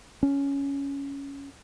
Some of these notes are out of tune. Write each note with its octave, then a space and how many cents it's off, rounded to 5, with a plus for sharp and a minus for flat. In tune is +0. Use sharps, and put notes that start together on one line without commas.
C#4 +10